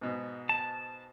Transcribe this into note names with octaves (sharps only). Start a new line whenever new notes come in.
G#2 B2
A5